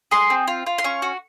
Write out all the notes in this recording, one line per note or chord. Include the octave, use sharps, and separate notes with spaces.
G#4 C6
C4
F4
F4
C6
C#4 C#6
F#4